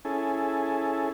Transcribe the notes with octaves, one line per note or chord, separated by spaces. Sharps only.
C#4 E4 G#4 A4